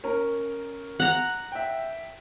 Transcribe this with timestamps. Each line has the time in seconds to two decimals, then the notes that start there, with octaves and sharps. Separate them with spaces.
0.04 C#4 A#4
1.00 F#5 A#5
1.52 E5 G5